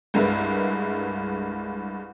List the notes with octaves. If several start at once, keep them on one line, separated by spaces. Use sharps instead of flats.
C2 G2 G#3 A#4 B4 E5